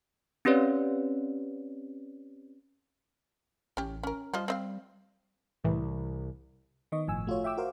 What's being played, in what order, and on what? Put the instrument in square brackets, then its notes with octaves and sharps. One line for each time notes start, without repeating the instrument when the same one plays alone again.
[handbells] C4 C#4 G4 B4 C#5 D5
[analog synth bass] A1 [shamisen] C#4 G4
[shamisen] C#4 A#4
[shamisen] F3 F4 D#5 [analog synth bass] G3
[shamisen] C4 D#5 F5
[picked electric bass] C2 [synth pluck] A2 E3
[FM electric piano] D#3 B3 D#5 C#6
G1 A2 F3 G#5 E6
A3 F4 F#4 C#5
E5 G5 D6 E6
F#4 A#4 C5 F5